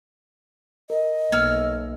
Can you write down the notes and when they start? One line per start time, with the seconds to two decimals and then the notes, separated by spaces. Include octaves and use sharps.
0.90 A#4 D#5
1.32 B1 A#3 C#5 E6 F6